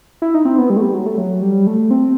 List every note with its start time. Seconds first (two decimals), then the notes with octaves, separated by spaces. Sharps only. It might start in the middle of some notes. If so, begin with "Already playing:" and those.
0.22 E4
0.34 D#4
0.45 C4
0.58 B3
0.70 G3
0.76 A3
0.82 G3
0.94 F#3
1.06 A3
1.18 F#3
1.42 G3
1.67 A3
1.91 C4